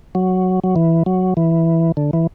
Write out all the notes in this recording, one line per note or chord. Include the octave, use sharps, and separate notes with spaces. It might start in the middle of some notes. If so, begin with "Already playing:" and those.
F#3
F#3
E3
F#3
E3
D3
E3